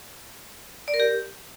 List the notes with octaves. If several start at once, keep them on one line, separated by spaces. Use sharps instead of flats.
D5
A#4
G4